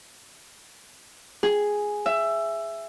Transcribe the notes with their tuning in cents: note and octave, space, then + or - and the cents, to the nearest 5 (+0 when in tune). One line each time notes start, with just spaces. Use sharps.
G#4 +0
E5 +15